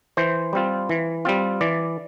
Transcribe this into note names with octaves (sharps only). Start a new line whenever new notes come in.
E3 C5
G3 C4 F4
E3
G3 C4 F4
E3 D5